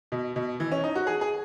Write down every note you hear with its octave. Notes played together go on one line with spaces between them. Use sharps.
B2
B2
E3
C#4
D#4
F#4
G#4
G#4